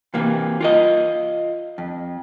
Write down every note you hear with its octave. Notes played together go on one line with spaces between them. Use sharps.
C3 E3 A#3
F4 A#4 D#5
F2